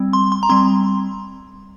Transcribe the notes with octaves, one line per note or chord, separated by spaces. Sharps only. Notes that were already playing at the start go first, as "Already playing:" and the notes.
Already playing: G3 C4
C6
C6
A#5
G3 C4 C6